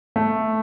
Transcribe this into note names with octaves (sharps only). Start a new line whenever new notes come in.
A3